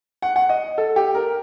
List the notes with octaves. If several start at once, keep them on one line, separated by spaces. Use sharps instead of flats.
F#5
F#5
D#5
A4
G4
A#4